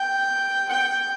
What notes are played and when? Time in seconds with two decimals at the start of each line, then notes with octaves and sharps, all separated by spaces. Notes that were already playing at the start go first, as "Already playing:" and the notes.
Already playing: G5
0.69 G5